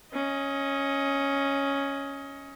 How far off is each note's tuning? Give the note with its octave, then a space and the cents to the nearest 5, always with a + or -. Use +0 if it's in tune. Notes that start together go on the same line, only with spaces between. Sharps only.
C#4 +0 D#5 +25